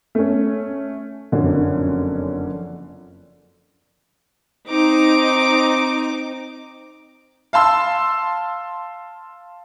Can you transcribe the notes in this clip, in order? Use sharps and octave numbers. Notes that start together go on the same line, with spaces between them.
A3 C#4
F#1 F2 D3 F#3 C#4
C4 D#4 D6
F5 A5 C6 E6